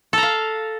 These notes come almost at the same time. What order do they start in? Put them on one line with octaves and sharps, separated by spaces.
A4 A#5 F5